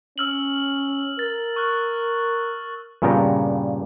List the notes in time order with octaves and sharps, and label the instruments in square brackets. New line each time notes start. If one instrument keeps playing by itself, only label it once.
[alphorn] C#4 [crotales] E6 F6 F#7
[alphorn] A#4 [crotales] A6
[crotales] C#6 F6 F#6
[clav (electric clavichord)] G2 A#2 C#3 B3 G5 A#5